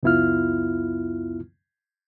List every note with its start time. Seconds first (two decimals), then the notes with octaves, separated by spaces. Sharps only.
0.03 C#2 F#2 B3 E4 F4 F6